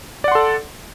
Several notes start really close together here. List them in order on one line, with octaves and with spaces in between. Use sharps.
D5 F#5 C6 A4